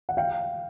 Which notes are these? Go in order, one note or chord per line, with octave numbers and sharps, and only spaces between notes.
F#5
F5 G5